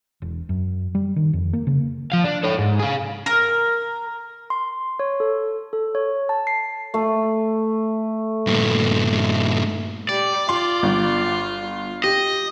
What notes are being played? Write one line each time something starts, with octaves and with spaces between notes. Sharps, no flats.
E1
F#2
G3
D#3
F2
A#3
C#3
F3 F5
D4
A4 C#5
G#2
G#4 F5
A#4
C6
C#5
A4
A4
C#5
A5
C7
A3
G2 A#2
G3 D5
F4 C6
G1
G4 D#5